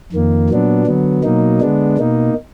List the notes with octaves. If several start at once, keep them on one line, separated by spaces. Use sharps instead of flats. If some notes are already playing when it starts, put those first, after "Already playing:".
F2 D#3 A#3
A#2 F#3 B3 D4
D3 F#3 B3
B2 F#3 A#3 D#4
D3 G#3 B3 D4
B2 A#3 D#4